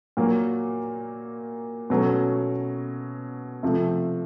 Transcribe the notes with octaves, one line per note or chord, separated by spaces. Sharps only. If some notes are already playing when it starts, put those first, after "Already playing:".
A#2 F#3 A#3
B2 F#3 A3 C#4
C3 F3 A3